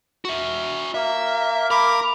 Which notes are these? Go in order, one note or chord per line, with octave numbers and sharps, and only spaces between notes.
F#4 E5
A#3 E5
A#4 B5 D6